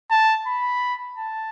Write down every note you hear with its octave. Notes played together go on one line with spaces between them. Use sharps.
A5
B5
A5